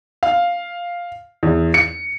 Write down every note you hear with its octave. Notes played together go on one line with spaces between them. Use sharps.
F5
E2
C#7